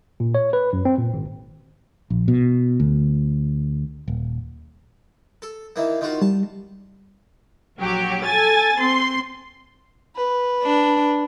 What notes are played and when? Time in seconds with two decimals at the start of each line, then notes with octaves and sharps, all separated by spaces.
0.20 A#2
0.35 C#5
0.53 B4
0.73 F#2
0.85 C4
0.98 A#2
1.14 G#1
2.10 A#1
2.28 B2
2.80 D2
4.08 D#1
5.42 A4
5.76 D#3 E3 A#3
6.01 D#3 F4 F#4
6.22 G3 A5
7.79 A#1 F#3 G4
8.24 A4 G#5 A6
8.79 C4 C6
10.16 B4
10.63 D4